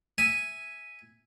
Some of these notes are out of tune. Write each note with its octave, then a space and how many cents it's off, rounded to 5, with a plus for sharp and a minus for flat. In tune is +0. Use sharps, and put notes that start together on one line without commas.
E5 +0 G#5 +0 D#6 +0